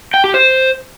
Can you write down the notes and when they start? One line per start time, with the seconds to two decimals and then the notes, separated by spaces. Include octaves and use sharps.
0.14 G5
0.24 G4
0.34 C5